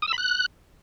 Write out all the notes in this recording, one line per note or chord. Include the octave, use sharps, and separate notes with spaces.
D#6
E6
B5
F#6